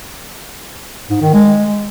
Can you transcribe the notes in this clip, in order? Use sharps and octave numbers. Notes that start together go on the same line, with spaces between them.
G#2
D#3
G#3